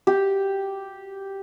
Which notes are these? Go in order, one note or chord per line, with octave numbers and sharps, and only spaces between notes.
G4